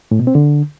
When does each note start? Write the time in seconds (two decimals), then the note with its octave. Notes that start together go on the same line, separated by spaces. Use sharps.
0.11 A2
0.19 B2
0.27 C4
0.35 D3